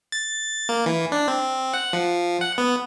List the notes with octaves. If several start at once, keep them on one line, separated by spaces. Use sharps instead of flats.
A6
A#3
E3
D4
C4
F#5
F3
F#5
B3